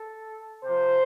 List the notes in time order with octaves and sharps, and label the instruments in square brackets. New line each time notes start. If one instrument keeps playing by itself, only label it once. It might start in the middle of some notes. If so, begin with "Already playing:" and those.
Already playing: [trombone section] A4
C3 F3 C5